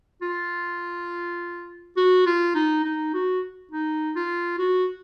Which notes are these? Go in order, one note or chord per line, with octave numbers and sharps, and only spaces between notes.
F4
F#4
F4
D#4
D#4
F#4
D#4
F4
F#4